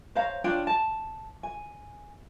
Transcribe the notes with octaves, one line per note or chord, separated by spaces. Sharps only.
C5 C#5 F5 A#5
D4 F4 C#5 G5
A5
G#5